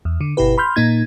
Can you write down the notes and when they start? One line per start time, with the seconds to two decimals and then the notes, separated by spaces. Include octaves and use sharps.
0.05 E2
0.21 D3
0.37 G1 B2 E4 G4 B4
0.58 B5 C6 F6 G6
0.76 A#2 A#3 D#4 G#6